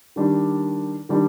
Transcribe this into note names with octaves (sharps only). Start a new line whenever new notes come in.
D#3 G3 D4
D#3 G3 D4